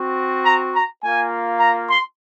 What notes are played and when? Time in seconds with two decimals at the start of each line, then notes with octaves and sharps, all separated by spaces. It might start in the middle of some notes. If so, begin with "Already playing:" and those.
Already playing: C4 F#4
0.45 A#5
0.74 A#5
1.02 A#3 F4 G#5
1.60 A#5
1.88 C6